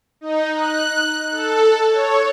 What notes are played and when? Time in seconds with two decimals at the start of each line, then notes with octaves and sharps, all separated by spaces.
0.21 D#4
0.54 F#6
1.31 A4
1.89 C#5